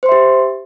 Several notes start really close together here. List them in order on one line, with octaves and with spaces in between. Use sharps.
C5 C6 E5 G4